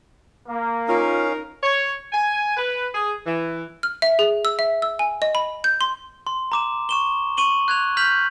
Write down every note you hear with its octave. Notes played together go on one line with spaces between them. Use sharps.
A#3
C#4 D#4 F4 A#4 F5
C#5
G#5
B4
G#4
E3
F6
E5
G#4
E6
E5
E6
G#5
D#5
B5
G6
C6
C6
A#5 D6 E7
C#6 E7 G7
C#6 D#7 F#7 G7
F#6 G#6 F7
F6 G6 B6 F7 F#7